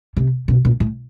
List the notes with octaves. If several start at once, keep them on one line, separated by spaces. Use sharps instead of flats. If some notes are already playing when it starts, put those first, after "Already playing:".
C3
B2
A#2
A2